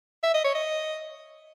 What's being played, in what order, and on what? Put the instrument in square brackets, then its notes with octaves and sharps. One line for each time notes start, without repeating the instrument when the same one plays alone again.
[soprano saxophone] E5
D#5
C#5
D#5